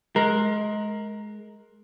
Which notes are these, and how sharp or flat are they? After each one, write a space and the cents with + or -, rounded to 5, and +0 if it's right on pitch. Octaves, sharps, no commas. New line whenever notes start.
G#3 +25 A#4 +0